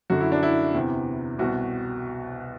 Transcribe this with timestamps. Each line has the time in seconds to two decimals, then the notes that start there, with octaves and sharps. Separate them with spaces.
0.10 F#2 D3 F#4
0.20 E4
0.32 D4
0.43 E4
0.74 E2 C3 E3
1.39 C2 B2 F#4